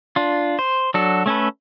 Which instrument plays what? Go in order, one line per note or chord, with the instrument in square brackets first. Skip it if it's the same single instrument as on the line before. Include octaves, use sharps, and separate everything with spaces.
[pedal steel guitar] D4 F4
C5
F#3 D4 F#4 A4
A3 C#4 A4 B4